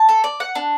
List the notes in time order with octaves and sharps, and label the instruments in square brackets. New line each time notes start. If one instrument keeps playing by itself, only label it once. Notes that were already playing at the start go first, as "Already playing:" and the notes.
Already playing: [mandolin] A5
A4
D5
F#5
D4